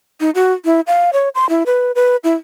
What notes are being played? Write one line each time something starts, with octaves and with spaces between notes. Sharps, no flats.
D#4
F#4
E4
F5
C#5
C6
E4
B4
B4
E4